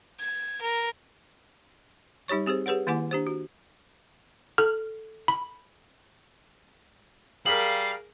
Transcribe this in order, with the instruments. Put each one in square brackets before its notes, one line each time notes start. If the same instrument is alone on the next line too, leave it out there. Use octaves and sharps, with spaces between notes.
[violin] G#6
A#4
[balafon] G3 D#4 G4 C#5 C#6
C4 G4 G#4 C5
G4 G#4 B4 C#5 F#5
D#3 A#3 E4 F#5 G#5 D6
D4 G4 C5
F#4
[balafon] A4 [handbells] F6
[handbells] B5
[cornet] G3 [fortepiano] G#4 A#4 [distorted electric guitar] F5 [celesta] B6 F#7